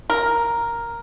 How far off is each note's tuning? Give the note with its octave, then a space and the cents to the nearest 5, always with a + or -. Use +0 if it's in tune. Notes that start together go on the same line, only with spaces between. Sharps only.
A#4 +5